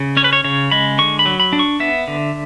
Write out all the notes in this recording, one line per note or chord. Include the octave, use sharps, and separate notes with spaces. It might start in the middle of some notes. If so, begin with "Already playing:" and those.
Already playing: C#3
C#4 C#5
B4
C#5
C#3 C#5
G#3 B5
D3 C#6
B5
F#3
B5
D4
C#6
B3 E5
D3